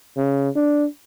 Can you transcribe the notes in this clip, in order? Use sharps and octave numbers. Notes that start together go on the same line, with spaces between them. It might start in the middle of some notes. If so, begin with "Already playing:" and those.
C#3
D4